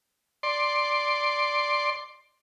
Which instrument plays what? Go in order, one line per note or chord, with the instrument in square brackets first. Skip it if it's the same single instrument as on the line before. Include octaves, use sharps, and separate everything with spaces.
[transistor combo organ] D5 C6